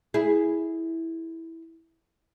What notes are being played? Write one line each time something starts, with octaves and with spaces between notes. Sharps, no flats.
E4 G#4